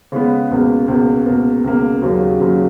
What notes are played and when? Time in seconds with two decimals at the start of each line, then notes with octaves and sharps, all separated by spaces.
0.12 C#3 G#3 B3
0.51 C#2 B2 A#3
0.88 C#2 B2 A#3
1.26 C#2 B2 A#3
1.64 C#2 B2 A#3
2.02 D#2 C#3 F#3
2.40 D#2 C#3 F#3